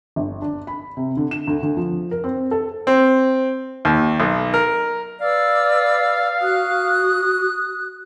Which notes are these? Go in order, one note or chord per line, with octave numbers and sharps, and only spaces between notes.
G1
D4
B5
C3
D3
E7
D2
D2
F3
A#4
C4
A4
C4
D#2
B1
A#4
B4 D5 F5 E6
F#4 D#6 F#6